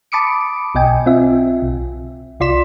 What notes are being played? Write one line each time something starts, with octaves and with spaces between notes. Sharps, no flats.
A5 B5 D6 D#6 C#7 D7
B1 B2 D#5 G5 G#5
C4 F4 E5
B1
C2 F4 D5 C6 B6 E7